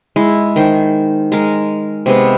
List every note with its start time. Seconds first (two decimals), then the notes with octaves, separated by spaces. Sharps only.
0.16 G#3 E4
0.56 D#3 C5
1.32 G#3 A#4
2.06 C3 G#3 B3